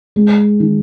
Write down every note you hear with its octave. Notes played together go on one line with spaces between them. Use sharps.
G#3
D#3